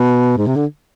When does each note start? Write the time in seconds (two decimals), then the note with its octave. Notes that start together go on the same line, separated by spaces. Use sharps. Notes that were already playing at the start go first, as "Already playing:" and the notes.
Already playing: B2
0.37 G#2
0.47 C3
0.56 D3